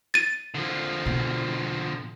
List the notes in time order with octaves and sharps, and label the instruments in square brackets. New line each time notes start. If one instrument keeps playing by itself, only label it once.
[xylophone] A6 D#7
[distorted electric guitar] D3 F3
[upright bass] B2